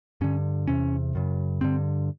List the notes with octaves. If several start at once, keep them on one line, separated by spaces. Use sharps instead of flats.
G2 D3 C#4
E2 C3 C#4
F#2 C#3
G2 D3 C4